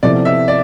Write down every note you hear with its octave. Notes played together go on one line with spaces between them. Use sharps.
C3 F3 B3 E4 A4 D5
E5
D5